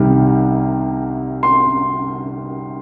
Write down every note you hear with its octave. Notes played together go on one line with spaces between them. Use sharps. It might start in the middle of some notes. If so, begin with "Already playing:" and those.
Already playing: C2 C3 D#3 G3
C6